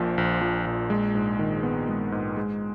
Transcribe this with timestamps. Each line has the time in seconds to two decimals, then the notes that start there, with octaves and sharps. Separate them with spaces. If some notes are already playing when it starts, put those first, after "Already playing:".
Already playing: A#1 A#2 F3
0.18 A#1
0.41 F3
0.66 A#1
0.90 G#3
1.15 G#2
1.39 D#3
1.63 B3
1.89 G#3
2.12 G#2
2.37 G#3